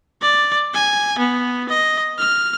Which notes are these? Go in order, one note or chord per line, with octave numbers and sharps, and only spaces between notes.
D5
G#5
B3
D#5
F6